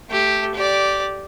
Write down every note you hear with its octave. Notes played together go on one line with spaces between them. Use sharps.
A3 G4
G4 D5